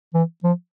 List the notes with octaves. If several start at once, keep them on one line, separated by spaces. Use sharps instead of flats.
E3
F3